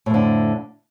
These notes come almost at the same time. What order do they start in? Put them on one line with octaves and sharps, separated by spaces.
A2 F2 D3